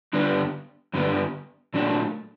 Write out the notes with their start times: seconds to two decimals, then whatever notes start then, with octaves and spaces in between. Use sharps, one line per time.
0.13 G2 D3 G3 B3 D4
0.94 G2 D3 G3 B3 D4
1.74 A#2 F#3 A3 D4